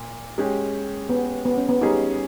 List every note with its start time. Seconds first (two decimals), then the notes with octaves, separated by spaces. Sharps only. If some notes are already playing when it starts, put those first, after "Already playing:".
Already playing: A#2
0.38 G#3 C#4 G4
1.09 B3
1.45 B3
1.57 C#4
1.69 B3
1.81 G3 C#4 D#4 G#4